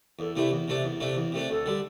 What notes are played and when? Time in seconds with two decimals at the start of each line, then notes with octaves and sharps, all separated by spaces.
0.19 E2 A4
0.35 C3 A3 D4 E4
0.52 E2
0.68 C3 A3 D4
0.84 E2
1.00 C3 A3 D4
1.17 E2
1.32 C3 A3 D4
1.49 D2 A4
1.66 D3 G3